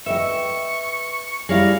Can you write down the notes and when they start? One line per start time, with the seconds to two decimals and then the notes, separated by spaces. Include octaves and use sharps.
0.06 B4 D#5 E5 G5 C#6
1.49 G3 E4 G4 G#4 A#4 C#5 F5